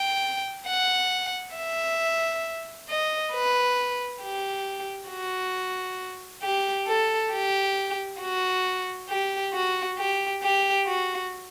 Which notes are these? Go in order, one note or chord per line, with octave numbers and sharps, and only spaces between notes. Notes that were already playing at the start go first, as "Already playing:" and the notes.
Already playing: G5
F#5
E5
D#5
B4
G4
F#4
G4
A4
G4
F#4
G4
F#4
G4
G4
F#4